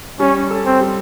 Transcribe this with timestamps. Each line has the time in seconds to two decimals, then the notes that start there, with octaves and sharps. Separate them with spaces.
0.20 G3 C#4
0.51 A4
0.66 C4
0.81 G3